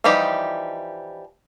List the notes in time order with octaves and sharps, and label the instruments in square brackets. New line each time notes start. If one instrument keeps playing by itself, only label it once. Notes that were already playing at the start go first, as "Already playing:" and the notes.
[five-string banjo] E3 F3 G3 D#4 G4